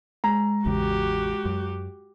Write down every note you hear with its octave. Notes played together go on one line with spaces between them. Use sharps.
G#3 A#5
A1 E2 C#3 F#4 G4
F#2